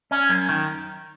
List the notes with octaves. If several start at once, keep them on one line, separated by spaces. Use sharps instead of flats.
C#4
F#2
D#3